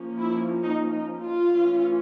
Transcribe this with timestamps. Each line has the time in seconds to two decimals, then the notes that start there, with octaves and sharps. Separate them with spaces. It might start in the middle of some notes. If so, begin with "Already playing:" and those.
Already playing: F3 A#3 C#4
0.19 E4
0.63 D#4
0.92 D#4
1.21 F4
1.49 E3 A3 C#4